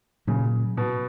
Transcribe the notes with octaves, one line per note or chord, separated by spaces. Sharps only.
A#2 C#3 F#3 A#3
B2